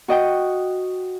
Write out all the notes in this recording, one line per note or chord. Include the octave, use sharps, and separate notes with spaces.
F#4 D#5 G5